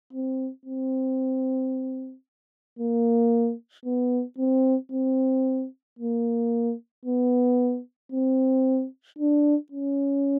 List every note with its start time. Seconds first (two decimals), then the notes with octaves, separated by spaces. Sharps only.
0.13 C4
0.65 C4
2.79 A#3
3.85 B3
4.39 C4
4.92 C4
5.99 A#3
7.05 B3
8.12 C4
9.18 D4
9.72 C#4